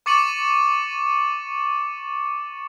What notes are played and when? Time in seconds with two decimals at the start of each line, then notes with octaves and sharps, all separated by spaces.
0.06 C#6 D6 A6 C#7 D#7 F#7